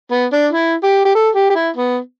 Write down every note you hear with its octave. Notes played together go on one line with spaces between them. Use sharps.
B3
D4
E4
G4
G4
A4
G4
G4
E4
B3